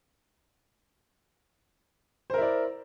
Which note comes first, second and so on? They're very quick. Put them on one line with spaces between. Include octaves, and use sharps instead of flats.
C5 A#4 E4 D5